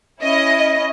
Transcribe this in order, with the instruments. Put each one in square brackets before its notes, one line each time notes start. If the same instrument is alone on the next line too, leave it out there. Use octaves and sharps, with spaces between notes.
[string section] C#4 E4 D#5